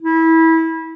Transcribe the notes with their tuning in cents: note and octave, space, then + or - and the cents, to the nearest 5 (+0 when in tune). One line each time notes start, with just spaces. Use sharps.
E4 -25